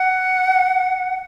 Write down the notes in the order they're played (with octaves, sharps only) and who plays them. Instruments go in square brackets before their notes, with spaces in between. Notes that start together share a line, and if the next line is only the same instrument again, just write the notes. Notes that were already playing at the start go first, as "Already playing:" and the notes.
Already playing: [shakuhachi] F#5